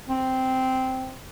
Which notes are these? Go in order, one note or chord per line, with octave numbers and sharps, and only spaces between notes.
C4